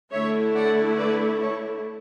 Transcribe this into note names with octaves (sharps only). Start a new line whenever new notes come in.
D3 A3 E4 C#5 E5
D5 F#5
B4 D5
A4 C#5